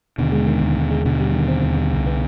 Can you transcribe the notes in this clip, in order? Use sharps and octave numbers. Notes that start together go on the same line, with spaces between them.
D#2 B2 D3
G#3
D#3
D#2
D#2
G#3
D#2 B2 D3
G3
D#3
C4
D#2
G3
C2
B3